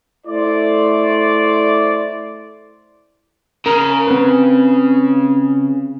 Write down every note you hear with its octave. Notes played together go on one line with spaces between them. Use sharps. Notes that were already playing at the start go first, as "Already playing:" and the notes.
A3 E4 C5 D5
C#3 A#4
C4 B4